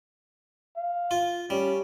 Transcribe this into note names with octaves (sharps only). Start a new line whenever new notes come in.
F5
F4
G3 C#4